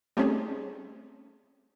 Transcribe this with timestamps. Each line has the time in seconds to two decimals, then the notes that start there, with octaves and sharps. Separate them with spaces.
0.17 G3 A3 C4 C#4 D#4 G#4